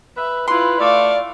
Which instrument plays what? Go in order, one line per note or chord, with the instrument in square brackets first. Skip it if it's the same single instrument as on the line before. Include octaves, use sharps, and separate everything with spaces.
[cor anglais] B4 [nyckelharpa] E5
[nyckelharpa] E4 F4 [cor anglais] B4 [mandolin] C6
[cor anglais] A3 [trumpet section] D5 [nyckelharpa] F5